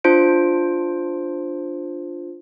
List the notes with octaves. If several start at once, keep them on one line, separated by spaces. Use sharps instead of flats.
D4 F4 C5 D7